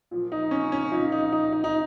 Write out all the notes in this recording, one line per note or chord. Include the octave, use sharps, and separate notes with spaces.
A#2 F3
D#4
C#4
C#4
A#2 F3 D#4
D#4
D#4
D#4
D#4